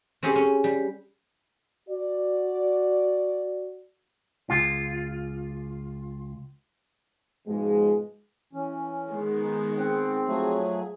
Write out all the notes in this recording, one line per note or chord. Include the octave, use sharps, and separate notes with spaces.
C4 C#4 G4 G#4
C#4
G3
F#4 D5
C#2 F4
G#2 B2 F3 G#3
E3 C#4
D#3 G#3 B3
D#4
C4 F#5 G5
F3 F#3 A3 G#4